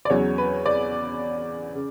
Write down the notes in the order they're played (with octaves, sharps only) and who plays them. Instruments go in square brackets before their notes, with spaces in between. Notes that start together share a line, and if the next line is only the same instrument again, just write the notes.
[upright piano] D5
E2 C#3 F#3 C#5
B4
D5
C#3